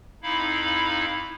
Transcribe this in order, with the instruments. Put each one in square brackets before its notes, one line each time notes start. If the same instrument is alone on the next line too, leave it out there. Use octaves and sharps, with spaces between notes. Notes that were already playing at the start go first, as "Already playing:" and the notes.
[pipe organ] F2 D#4 E4 F5 B5